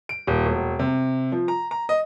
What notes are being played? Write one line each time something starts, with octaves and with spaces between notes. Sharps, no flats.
D7
D#1
E1
C3
F3
A#5
A#5
D#5